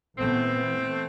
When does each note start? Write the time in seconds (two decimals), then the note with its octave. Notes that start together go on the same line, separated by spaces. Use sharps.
0.18 A#2 E3 A3 B3 C4